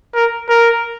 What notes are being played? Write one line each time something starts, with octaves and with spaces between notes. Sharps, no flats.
A#4
A#4